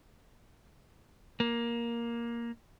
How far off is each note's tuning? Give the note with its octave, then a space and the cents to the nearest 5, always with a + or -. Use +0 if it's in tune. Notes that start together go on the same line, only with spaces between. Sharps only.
A#3 +10